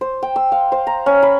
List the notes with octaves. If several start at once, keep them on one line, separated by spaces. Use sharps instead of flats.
C5
G5
E6
F5
C5
A#5
C#4
B5